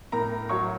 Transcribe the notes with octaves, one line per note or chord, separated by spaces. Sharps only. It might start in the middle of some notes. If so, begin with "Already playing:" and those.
A2 A#4 A#5
F#3 C#5 C#6